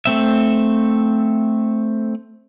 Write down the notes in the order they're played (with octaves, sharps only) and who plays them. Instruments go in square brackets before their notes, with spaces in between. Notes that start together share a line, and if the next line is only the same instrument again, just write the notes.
[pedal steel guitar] A3 C4 E5